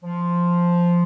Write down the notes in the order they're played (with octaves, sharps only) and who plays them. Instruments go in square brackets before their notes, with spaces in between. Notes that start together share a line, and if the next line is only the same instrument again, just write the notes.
[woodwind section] F3